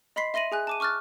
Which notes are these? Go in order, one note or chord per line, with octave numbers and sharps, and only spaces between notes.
D#5 B5 C6 B6 C7
E5 C6 A#6 D#7 F#7
G#4 G#5 F#6
A5 D6 D#7
C#6 D6 F6 F#6 A6